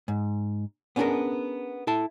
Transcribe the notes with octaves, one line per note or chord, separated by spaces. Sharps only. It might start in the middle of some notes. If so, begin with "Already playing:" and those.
G#2
B3 C#4 D4 G4 G#4 A#4
E4 A4 A5